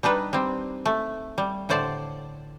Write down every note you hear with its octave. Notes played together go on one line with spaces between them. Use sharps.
G3 D4 D#4 B4
G3 C4
A3
G3
A2 D3 C5 D5 A5